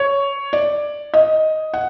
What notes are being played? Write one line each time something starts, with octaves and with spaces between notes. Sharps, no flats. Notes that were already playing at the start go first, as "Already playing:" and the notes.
Already playing: C#5
D5
D#5
F#5